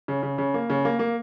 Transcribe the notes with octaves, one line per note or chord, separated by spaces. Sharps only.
C#3
C#3
C#3
A#3
C#3
A#3
A#3